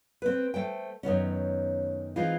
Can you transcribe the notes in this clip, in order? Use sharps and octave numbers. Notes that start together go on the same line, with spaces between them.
C4 B4
A3 C5 G5
F#2 D#3 B3 C#4
E3 G#3 C4 D#4 F4